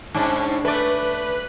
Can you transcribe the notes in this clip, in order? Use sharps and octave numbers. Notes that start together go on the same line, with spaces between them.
G#2 C#4 D4
A3 B4 D5